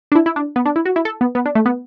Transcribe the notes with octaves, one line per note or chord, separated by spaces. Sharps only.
D4
E4
E4
D4
B3
D4
E4
F#4
E4
A4
B3
B3
D4
A3
B3